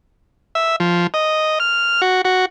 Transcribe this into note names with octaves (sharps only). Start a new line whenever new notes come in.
E5
F3
D#5
F6
F#4
F#4